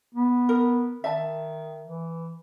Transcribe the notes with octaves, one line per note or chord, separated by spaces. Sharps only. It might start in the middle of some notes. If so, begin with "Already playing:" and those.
B3
A#4
D#3 E5 A5
E3